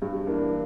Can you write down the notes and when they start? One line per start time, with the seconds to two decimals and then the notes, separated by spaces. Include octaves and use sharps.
0.02 G2
0.27 E3 A#3 D4